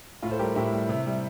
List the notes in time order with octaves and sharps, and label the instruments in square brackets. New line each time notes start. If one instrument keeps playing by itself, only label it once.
[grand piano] A2 F4
A4 C5
G3 G4 A#4
A2 E4 G4
G3
C3
G3